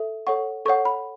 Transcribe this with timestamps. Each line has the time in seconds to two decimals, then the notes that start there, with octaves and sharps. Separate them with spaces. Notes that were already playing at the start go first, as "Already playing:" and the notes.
Already playing: A4 E5
0.27 A4 C#5 F#5 C#6
0.65 A4 C#5 F#5 C#6
0.85 B5